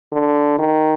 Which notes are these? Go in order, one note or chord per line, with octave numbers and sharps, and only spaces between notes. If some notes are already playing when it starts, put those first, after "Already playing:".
D3
D#3